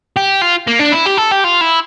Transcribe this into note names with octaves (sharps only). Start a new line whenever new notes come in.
G4
F4
A#3
D4
E4
G4
A4
G4
F4
E4